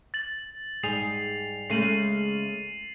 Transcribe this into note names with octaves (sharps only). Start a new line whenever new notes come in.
A6 F#7
G#2 G3 G#4 C7 F7
C#3 G#3 A3 C7 D#7 F#7